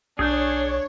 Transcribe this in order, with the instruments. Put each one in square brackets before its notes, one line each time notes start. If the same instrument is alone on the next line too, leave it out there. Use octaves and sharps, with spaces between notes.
[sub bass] B1 [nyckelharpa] D4 [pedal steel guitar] G#4 G6 [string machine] C#5